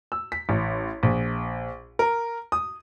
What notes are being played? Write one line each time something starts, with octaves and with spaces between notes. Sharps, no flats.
E6
B6
A1
A#1
A#4
D#6